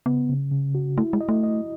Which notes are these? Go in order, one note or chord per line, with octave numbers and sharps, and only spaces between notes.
C#3 B3
C#3
C#3
F#4
A3 E4
G#3
D#5
A3
D#5